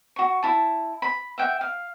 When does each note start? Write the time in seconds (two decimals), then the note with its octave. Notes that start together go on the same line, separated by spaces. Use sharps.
0.16 F#4 C#6
0.43 E4 A5
1.02 B5
1.38 E5 F#5 G5
1.61 F5